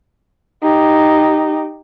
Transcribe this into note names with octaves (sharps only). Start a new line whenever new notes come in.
D#4 G4